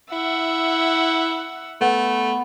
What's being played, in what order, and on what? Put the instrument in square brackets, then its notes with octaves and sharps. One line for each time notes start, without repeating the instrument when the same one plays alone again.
[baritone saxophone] E4 [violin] E5 F#5
[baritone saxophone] A3 [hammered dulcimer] B3